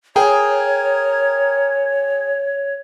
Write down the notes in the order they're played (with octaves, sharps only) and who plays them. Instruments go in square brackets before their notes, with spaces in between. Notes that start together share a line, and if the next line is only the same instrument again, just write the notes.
[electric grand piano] G#4 G5 [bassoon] A#4 [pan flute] C#5